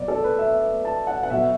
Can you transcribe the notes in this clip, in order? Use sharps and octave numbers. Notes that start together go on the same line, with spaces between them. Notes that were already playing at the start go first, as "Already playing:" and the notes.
Already playing: B2 F#3 D5
A4
B4
E5
A5
F#5
F#5
B2 F#3 E5